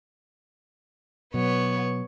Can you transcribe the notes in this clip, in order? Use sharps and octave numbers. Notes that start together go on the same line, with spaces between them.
B2 F#3 B3 C#5